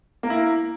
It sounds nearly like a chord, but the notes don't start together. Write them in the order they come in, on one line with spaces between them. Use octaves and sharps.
A#3 A#4 E4